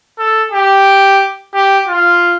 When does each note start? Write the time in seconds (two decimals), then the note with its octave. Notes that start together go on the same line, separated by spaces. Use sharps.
0.18 A4
0.52 G4
1.54 G4
1.88 F4